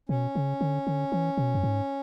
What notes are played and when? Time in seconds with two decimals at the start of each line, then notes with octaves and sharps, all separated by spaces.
0.09 B2 C#4
0.36 C#3
0.61 D3
0.87 D3
1.12 E3
1.37 B2
1.55 F#2
1.64 G#2